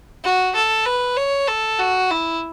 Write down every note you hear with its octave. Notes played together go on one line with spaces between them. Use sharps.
F#4
A4
B4
C#5
A4
F#4
E4